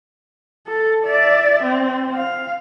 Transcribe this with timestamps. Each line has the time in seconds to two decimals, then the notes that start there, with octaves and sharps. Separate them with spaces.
0.67 A4
1.05 D5 E5
1.63 C4
2.14 F5